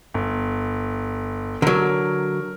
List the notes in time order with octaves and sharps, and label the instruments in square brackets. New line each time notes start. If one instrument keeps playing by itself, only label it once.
[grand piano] G1
[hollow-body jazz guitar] D3 F#3 [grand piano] A#4